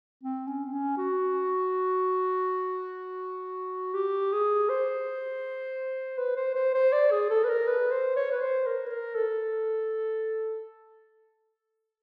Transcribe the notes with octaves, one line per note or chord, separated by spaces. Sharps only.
C4
C#4
C4
C#4
F#4
G4
G#4
C5
B4
C5
C5
C5
D5
G#4
A4
B4
A#4
B4
C5
C#5
B4
C5
A#4
B4
A#4
A4